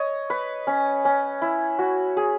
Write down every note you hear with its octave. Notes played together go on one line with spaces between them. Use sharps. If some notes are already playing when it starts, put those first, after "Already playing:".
Already playing: C#5 D#5
B4
C#4
C#4
E4
F#4
G#4